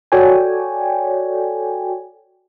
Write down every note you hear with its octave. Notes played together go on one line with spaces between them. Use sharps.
F#4 A4 C#5 D5 G5 G#5